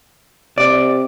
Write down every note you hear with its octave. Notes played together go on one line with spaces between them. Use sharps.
C3 D5